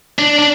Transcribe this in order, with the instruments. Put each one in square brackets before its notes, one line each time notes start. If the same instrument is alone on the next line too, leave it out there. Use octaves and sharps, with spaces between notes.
[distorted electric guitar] D4
D4